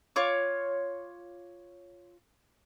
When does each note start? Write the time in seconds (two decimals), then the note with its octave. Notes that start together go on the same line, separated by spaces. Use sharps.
0.16 F4 C#5 D6